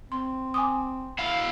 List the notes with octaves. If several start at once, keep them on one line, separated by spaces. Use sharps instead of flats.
C4 C6
G#5 D6 D#6
E4 F5